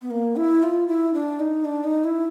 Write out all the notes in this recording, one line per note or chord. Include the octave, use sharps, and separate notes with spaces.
B3
A#3
E4
F4
E4
D4
D#4
D4
D#4
E4